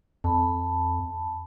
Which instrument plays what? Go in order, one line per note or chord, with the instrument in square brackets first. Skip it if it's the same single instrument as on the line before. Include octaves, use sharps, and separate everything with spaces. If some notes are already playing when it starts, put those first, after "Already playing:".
[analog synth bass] F2 [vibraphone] A5 B5